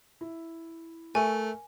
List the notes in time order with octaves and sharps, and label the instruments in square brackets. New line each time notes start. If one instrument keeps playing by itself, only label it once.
[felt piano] E4
[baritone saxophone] A3 [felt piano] A#4 E5 C#6 [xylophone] G#5